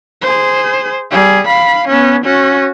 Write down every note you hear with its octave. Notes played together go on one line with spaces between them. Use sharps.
G#4 C5
G3 G#4
F5 B5
B3 C#4
C#4 F#4